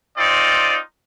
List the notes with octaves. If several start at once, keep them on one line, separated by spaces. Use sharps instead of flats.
C4 D#4 F4 D5